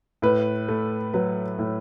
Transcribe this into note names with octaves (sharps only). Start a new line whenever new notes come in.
A2 B4
A3
F#3 B4
A2